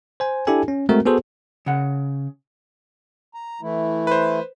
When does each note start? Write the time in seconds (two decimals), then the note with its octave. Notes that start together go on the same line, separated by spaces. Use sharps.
0.20 C5 G#5
0.47 D4 E4 G4 A4 G#5
0.68 C#4
0.89 G#3 A3 C4 F#4 A#4
1.06 B3 F#4 G#4 A4 C5
1.66 C#3 F#5
3.34 A#5
3.61 E3 A3 E4
4.07 B4 C5